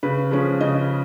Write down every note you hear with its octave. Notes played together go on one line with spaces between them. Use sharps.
C#3 B4
F3 G#3 C#4
C#3 D#5